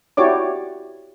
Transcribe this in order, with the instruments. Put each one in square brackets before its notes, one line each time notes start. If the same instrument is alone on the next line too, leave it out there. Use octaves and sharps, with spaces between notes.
[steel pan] E4 F#4 G4 C#5 D5 D6